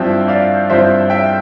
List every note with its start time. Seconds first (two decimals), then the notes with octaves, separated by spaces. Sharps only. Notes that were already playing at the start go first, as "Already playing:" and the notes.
Already playing: G2 F3 C4 E4 E5 G5
0.28 D5 F5
0.69 G2 F3 C4 E4 C5 E5
1.10 E5 G5